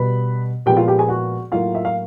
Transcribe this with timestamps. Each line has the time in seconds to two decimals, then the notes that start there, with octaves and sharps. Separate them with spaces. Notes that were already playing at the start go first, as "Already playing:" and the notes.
Already playing: B2 G3 B3 B4 B5
0.66 A#2 F3 G#3 B3 G4 G5
0.77 F4 F5
0.88 G4 G5
0.98 G#4 G#5
1.09 F#4 F#5
1.52 A2 F#3 A#3 F4 F5
1.75 E5
1.85 F5